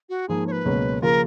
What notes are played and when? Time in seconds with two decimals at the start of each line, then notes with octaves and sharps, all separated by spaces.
0.09 F#4
0.28 G#2 F3 A#3 G#4
0.47 C#5
0.52 B4
0.65 C#2 B2 F#3 A#3 C#4
1.02 C#3 F3 A#3 F4 A#4